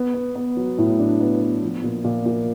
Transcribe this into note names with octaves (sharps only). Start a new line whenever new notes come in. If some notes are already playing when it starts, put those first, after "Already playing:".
Already playing: B3
B3
B3
F#3
A2
D4
B3
B3
F3
A#2
A#2
A#2